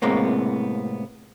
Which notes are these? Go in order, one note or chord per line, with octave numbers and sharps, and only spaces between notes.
A2 C3 G#3 A#3 B3